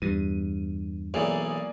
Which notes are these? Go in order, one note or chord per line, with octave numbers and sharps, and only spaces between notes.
E2 G2 D#7
B1 E3 A#3 G#4 D5